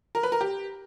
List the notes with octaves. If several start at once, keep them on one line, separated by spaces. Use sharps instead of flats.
A#4
B4
A#4
G4